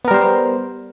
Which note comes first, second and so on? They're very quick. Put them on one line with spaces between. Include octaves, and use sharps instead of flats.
B3 A#4 G3 C5